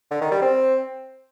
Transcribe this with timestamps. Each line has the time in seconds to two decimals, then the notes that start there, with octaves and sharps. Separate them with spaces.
0.11 D3
0.21 D#3
0.31 G3
0.42 C4